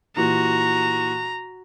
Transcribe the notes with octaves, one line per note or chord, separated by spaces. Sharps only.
A#2 E3 F#4 G4 A#5